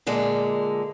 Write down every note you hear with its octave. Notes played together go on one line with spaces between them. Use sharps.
A#2 D3 G#3